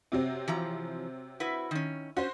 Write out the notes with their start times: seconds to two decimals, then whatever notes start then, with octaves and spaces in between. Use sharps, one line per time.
0.12 C3 F#3 C4
0.48 E3 F3 A#5
1.40 E4 F#4 B4
1.71 D#3 C#4
2.17 C#4 F#4 C5